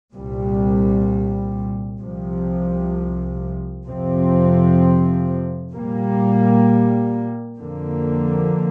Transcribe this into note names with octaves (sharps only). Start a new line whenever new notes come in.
C2 A#2 G3
C2 C3 F3
F2 C3 F3 C4
A#2 G3 A#3
F2 D3 A#3